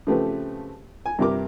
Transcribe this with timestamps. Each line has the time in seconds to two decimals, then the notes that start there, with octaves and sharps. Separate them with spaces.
0.07 C#3 F3 A3 C4 G4 B4
1.06 G#5
1.19 G2 C3 G4 A#4 D6